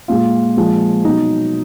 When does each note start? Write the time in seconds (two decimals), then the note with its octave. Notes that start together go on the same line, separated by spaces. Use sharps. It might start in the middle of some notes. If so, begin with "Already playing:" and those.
0.08 A#2 G#3 F4
0.57 A#2 F3 G#3
1.05 B2 F#3 D#4